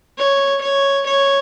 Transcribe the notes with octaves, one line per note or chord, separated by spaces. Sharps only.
C#5
C#5
C#5